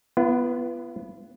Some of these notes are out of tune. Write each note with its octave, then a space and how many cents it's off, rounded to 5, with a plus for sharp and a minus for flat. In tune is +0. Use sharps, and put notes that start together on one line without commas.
B3 +0 F4 -45